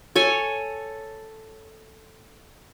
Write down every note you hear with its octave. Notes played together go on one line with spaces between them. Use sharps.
A4 C#5 G#5